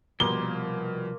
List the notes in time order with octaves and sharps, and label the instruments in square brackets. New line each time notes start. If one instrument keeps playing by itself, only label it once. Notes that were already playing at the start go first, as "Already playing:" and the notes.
[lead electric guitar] C2 F3 [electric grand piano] B2 G3 [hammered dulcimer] A#3 C6 [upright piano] G7